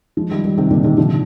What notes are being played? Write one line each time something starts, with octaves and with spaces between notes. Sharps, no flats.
F3 G#3
D#3 G3
D#3 G3
C3 D#3
A#2 D3
C3 D#3
D3 F3